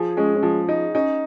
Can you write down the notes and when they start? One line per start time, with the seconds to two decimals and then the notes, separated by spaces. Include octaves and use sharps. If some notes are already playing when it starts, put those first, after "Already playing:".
Already playing: F3 G#4
0.17 G#3 C#4
0.35 C#4
0.43 F3
0.69 D#4
0.95 C#4 D#4